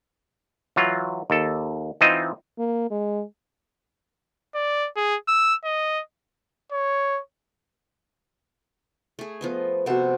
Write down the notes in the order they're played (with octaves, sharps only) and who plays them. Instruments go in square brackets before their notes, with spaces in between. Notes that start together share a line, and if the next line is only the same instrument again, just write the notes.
[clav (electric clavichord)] E3 F#3 F4
D#2 A4
E3 C4 D#4 F4 C5 D#5
[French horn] A#3
G#3
[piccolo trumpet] D5
G#4
E6
D#5
[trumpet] C#5
[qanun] A3 G#4
F3 B3 D#5
[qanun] C3 A4 C5 [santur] B3 F#4